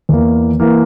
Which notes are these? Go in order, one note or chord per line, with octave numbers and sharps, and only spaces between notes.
E2 E3 A#3
E3 A#3